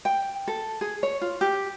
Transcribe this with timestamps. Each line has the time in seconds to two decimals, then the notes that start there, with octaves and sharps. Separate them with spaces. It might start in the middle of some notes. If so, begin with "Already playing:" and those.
0.05 G5
0.48 A4
0.81 G#4
1.03 C#5
1.21 F4
1.41 G4